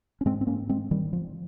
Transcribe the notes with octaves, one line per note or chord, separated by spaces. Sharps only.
C#4
G#2 G#3 C4
C4
A#3 C#4
G#3 C4
D#3 G3
F3